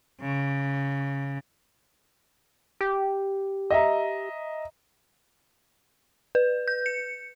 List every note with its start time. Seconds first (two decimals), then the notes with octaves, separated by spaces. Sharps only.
0.21 C#3
2.81 G4
3.71 D#5 E5 A#5
6.35 B4
6.68 G6
6.86 C#7